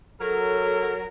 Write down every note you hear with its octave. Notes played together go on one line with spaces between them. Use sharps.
F#3 A4 A#4